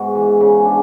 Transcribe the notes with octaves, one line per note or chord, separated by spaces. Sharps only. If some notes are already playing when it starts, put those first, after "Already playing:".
Already playing: G#2 B3 F#4
E3
C#3
D4